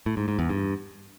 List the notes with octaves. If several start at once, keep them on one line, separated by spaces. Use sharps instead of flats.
A2
G#2
G#2
E2
G2